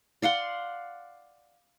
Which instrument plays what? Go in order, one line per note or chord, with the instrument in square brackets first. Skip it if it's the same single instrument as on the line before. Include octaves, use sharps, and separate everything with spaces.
[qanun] D5 F5 F#5 C6